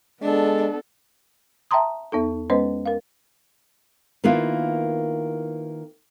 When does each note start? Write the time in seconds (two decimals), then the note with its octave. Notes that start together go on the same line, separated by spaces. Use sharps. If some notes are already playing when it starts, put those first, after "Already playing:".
0.22 G#3 B3 D4 A4
1.71 E5 G5 A5 A#5 C6 D#6
2.12 E2 B3 D#4 A4
2.50 G#3 B3 C#4 B4 C5 D#5
2.86 A#4 F5
4.24 D#3 A#3 B3 E4 F4